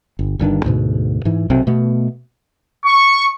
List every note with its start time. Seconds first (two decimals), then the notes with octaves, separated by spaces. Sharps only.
0.19 G1
0.39 G1 G2 D#3 D4
0.65 D2 G#2 B2
1.25 G#2 E3
1.50 B1 C3 C4
1.67 B2 A3 B3
2.85 C#6